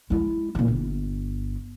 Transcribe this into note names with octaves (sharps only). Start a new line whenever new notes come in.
G#3 E4
A#2 E3
G1